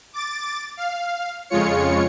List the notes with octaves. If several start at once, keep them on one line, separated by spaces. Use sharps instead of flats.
D6 A6
F5
F2 C#3 G#3 F4 C#5 C#7